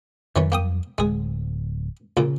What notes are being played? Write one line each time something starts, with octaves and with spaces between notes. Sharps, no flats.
F2 D#3 E3 F#3 G3 C#5
A#3 G5 D#6
D1 G#3 G#4
A#1 A#2 C#3